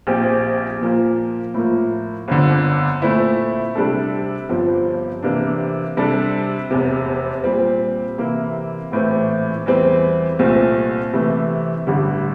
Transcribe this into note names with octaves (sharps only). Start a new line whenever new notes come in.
A#1 A#2 F3 C4 G4
A#2 F3 A#3
A2 F3 A#3
G1 F2 D3
A#2 A3 C4 E4
C3 G3 D4 A4
G1 G2 F3 C4
C3 E3 A#3 D4
C3 G3 D4 A4
F1 E2 C3
A#2 G3 C4
C3 E3 A#3 E4
A#1 A2 E3 A3 C4
E2 E3 G3 C4
C2 A#2 A3 C4
C3 E3 A3
A1 G2 D3 G3